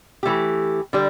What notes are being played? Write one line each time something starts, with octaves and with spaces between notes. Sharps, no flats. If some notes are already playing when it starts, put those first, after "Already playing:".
E3 A3 G4
D3 G3